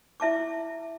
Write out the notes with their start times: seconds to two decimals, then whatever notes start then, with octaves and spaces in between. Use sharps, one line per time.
0.20 E4 E5 A5 D6